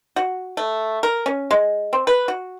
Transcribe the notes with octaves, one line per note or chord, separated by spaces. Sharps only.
F#4
A3
A#4
C#4
G#3
C4
B4
F#4